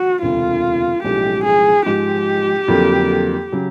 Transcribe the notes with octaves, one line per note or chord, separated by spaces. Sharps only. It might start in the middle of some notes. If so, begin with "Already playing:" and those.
Already playing: F#4
E1 D2 C3 F4
B1 A2 F3 G#3 C#4 G4
G#4
G#2 F3 G#3 G4
F2 D3 F#3 A#3
C#3 F#3